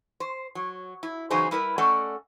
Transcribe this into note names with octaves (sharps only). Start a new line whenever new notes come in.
C5
F#3
E4
C#3 E3 F#3 D#4 G#4 C5
G3 E4 A#4 B4
A3 C#4 A4 D5 D#5 F#5